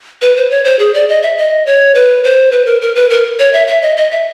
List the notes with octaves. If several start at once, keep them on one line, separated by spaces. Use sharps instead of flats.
B4
C5
C#5
C5
G#4
D5
D#5
E5
D#5
C#5
B4
C5
B4
A#4
A#4
B4
A#4
C#5
E5
E5
D#5
D#5
E5